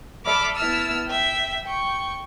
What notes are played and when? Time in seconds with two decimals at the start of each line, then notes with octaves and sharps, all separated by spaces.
0.24 A4 D5 E5 B5 D6 F6
0.55 B3 E4 E5 A5 E6 F6
1.06 E5 G5
1.63 G5 C#6